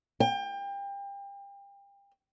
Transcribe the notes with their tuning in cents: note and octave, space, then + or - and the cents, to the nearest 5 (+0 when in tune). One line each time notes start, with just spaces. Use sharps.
G5 +30